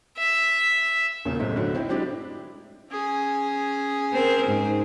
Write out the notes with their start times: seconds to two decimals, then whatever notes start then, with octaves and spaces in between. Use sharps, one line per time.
0.18 E5
1.25 E1 A#2 C#3
1.40 B1 A2 C3 G#3 A3 C5
1.56 A2 D3 F#3
1.74 C4 D#4 E4 G5
1.88 F#3 G#3 C4 D4 E4 G4
2.91 C#4 G#4
4.12 C4 A#4
4.46 G#2